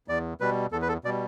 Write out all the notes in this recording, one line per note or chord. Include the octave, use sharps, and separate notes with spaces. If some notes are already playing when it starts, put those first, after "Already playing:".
E2 D5
B2 G3 B4
E2 A4
B4
A4
B2 G3 D5